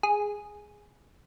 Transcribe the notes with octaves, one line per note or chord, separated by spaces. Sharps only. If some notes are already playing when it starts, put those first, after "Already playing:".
G#4